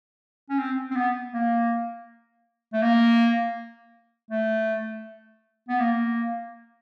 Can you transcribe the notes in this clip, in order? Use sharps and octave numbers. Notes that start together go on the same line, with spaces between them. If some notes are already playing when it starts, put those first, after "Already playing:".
C#4
C4
C4
B3
A#3
A3
A#3
A3
B3
A#3